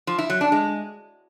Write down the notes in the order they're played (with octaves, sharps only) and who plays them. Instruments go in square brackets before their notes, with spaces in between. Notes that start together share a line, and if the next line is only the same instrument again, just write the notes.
[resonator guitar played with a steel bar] F3
E4
F#3
D4
G#3